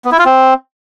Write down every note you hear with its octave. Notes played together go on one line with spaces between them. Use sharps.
B3
E4
F4
C4